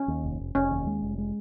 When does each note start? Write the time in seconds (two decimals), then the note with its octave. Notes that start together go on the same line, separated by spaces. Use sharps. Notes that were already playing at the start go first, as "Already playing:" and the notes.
Already playing: C#4
0.08 D#2
0.24 F1
0.40 F1
0.55 F1 C#4
0.71 D#2
0.87 G#3
1.02 F1
1.18 G#3